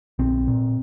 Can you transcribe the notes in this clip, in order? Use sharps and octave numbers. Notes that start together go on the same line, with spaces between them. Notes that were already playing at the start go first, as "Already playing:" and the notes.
A#1 C4
A#2